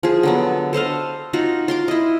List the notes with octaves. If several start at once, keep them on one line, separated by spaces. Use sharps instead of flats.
F3 G#4
D3 F#3 B3
A4 C5 D#5 F5
D#4 F4 F#4
F4 C6 D6
E4 D#5